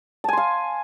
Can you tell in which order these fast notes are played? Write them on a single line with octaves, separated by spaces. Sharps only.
A5 G#5 C6 F5